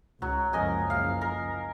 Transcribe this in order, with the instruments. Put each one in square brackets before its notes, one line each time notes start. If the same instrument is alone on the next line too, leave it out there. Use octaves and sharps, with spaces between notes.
[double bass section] C#2 [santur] F#3
[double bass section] F#1 C#2 F3 [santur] A#4 D#5 G#5
[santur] F5
A#4